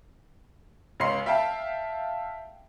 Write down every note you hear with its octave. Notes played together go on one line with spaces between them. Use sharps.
C#2 C#5 F5 C6 C7
E5 F5 G5 A5